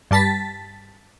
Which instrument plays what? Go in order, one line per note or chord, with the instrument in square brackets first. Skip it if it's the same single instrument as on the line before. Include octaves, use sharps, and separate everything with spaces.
[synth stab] G2 G3 A5 A6 B6